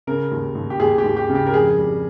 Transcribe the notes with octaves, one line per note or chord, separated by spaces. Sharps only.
C#3 A#4
D#2
D#2
G4
D#2 G#4
G4
D#2
G4
C#3
G4
A#4
F2 G#4
G3